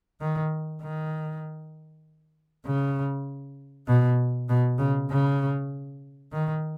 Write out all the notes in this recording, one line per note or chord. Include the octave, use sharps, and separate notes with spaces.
D#3
D#3
C#3
B2
B2
C#3
C#3
D#3